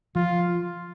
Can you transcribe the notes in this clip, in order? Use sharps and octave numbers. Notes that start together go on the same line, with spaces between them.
F3 F4